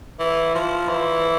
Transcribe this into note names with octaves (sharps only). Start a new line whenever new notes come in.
E3
F3
E3